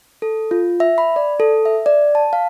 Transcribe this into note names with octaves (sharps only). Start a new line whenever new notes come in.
A4
F4
E5
B5
D5
A4
E5
D5
A5
F5